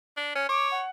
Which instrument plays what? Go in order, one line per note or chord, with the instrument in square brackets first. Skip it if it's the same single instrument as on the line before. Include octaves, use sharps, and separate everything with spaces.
[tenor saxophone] D4
C#4
[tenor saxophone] C#5 [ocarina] D6
[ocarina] F#5